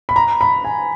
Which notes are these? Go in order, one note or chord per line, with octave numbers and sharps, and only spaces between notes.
B5
A#5
B5
G#5